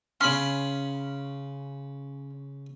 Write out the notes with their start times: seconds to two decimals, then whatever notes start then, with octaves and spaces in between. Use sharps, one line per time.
0.21 C#3 C#4 B5 C6